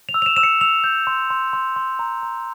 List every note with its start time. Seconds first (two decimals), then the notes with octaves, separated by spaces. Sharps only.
0.09 F7
0.14 E6
0.22 F7
0.26 E7
0.36 E6 E7
0.43 C#7
0.61 E6 F7
0.84 G6
1.07 C6
1.30 C6
1.53 C6
1.76 C6
1.99 A#5
2.23 A#5